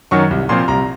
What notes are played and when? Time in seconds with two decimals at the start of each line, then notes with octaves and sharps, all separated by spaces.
0.11 F#2 D#3 F#3 C#4 C#6
0.31 C2
0.49 A#2 F3 C4 C6
0.68 C2 A#5